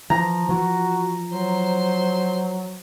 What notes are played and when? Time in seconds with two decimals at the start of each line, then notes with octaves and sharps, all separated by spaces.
0.10 E3 F3 A#5
0.49 E3 F3 F#4
1.30 F#3 C5 C6